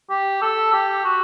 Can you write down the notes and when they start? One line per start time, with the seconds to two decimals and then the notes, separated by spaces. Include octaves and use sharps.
0.10 G4
0.42 A4
0.73 G4
1.04 F#4